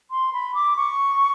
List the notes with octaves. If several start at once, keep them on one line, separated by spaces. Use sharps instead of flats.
C6
B5
D6
C#6